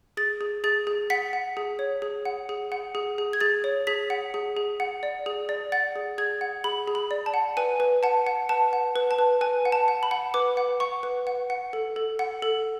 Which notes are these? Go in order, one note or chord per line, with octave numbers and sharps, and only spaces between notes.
G#4 A6
G#4
G#4 A6
G#4
F#5 B6
F#5
G#4
C#5
G#4
F#5
G#4
F#5
G#4
G#4
G#6
G#4 A6
C#5
G#4 B6
F#5
G#4
G#4
F#5
D5
G#4
D5
F#5 A6
G#4
G#4 G#6
F#5
G#4 B5
G#4
B5
D5
A5
F#5
B4 G#5
B4
F#5 A5
F#5
B4 A5
F#5
B4
A5
B4
B4 G#5
F#5
A5
F#5
B5
F#5
B4 D6
F#5
F#5 C#6
B4
F#5
F#5
A4
A4
F#5
A4